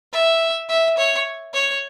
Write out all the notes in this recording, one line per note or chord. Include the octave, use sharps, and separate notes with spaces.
E5
E5
C#5
C#5